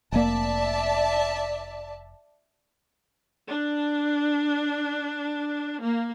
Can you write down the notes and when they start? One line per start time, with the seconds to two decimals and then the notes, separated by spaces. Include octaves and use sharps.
0.12 F1 A#3 D5 E5 A5
3.46 D4
5.81 A#3